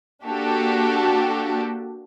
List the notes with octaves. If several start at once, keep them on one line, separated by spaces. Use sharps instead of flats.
A#3 D4 F#4 G4 A4